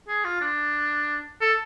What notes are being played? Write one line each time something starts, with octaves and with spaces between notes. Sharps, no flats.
G#4
F4
D4
A4